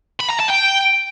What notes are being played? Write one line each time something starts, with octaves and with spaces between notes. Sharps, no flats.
B5
A#5
A5
G5